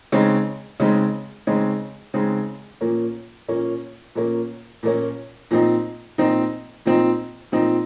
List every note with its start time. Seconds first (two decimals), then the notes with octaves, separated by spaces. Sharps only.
0.12 C#3 G#3 C4 D#4
0.80 C#3 G#3 C4 D#4
1.47 C#3 G#3 C4 D#4
2.14 C#3 G#3 C4 D#4
2.81 A#2 F3 A#3 C#4
3.48 A#2 F3 A#3 C#4
4.15 A#2 F3 A#3 C#4
4.83 A#2 F3 A#3 C#4
5.51 A#2 F3 C4 D#4
6.18 A#2 F3 C4 D#4
6.86 A#2 F3 C4 D#4
7.52 A#2 F3 C4 D#4